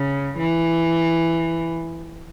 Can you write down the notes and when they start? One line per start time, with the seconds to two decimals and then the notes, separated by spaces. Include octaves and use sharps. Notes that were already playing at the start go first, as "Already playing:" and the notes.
Already playing: C#3
0.38 E3